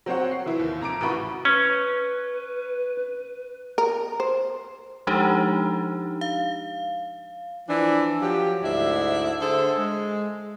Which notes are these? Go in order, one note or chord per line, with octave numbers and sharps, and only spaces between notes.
F#3 C4 C5 C#5 F#5
C7
E3 E4
D#2
F2 A#5 D6 D7
A1 E3 F#4 B5 C#6
C#4 B4
A#4
C5
F3 G#3 D4 D#4 G4
F5
E3 F3 D4
F3 F#3 G4
D2 G#2 D4 E4 E5
D3 G#4 A4 C5
G#3